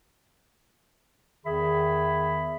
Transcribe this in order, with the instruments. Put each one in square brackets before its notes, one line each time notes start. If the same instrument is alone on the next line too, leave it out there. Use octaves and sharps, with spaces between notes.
[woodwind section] E2 D#3 G#4 E5 B5